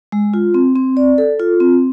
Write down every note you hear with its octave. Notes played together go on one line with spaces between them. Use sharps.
G#3
F4
C4
C4
D5
A4
F4
C4